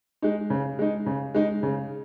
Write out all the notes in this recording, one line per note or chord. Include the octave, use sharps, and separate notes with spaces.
G#3 D#4
C#3
G#3 D#4
C#3
G#3 D#4
C#3